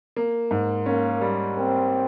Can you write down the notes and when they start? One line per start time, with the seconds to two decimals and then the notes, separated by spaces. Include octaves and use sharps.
0.16 A#3
0.51 G#2
0.86 A#3 C#4
1.21 G3
1.57 A#3 C4